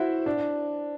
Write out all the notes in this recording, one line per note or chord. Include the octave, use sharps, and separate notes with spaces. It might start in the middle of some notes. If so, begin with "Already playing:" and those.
Already playing: E4 F#4 C5 E5
D4